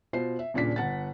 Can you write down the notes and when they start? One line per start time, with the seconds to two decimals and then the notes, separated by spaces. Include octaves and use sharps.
0.13 B2 F4 C5 C7
0.39 E5
0.54 D#1 A#2 C#3 D4 B6
0.76 G1 F#5 A6